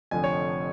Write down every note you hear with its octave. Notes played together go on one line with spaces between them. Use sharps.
F1 F2 D3 F3 G#5
C#5